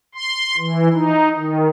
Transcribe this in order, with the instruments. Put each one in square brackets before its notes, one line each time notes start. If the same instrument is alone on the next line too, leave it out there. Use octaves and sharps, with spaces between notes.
[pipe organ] C6
E3
D#4
D#3